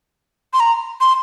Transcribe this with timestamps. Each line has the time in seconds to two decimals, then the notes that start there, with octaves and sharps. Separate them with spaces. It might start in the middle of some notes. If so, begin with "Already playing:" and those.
0.53 C6
0.60 A#5
1.01 C6